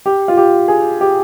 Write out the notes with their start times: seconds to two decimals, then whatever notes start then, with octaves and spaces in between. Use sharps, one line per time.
0.06 G4
0.28 F4
0.37 G4
0.68 G#4
1.01 G4